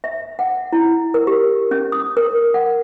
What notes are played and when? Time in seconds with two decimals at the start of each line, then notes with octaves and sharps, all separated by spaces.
0.04 E5
0.39 F#5
0.73 E4
1.14 A#4
1.27 G4
1.71 C#4
1.92 D#6
2.17 A#4
2.54 F#5